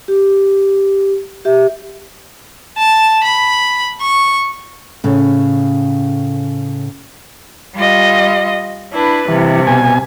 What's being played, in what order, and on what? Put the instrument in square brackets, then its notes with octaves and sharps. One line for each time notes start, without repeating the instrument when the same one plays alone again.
[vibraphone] G4
G4 E5
[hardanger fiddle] A5
B5
C#6
[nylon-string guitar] A2 C#3
[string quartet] G3 F4 D#5
D4 E4 B4
[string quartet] G2 C3 [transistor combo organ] E3
[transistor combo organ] B2 G#5